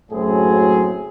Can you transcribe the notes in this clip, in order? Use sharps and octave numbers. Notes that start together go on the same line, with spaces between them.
F#1 A2 F#3 C4 G#4